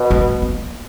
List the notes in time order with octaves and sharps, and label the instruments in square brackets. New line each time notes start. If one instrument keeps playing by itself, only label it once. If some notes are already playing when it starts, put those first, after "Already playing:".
Already playing: [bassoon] B2
[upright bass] A3
A#3